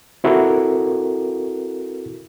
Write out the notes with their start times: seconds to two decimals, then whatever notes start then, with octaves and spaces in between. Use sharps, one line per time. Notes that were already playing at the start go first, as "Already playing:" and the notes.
0.24 C4 E4 F#4 A4 A#4